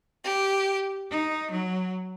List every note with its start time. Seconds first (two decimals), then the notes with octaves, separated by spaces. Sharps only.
0.24 G4
1.11 D#4
1.51 F#3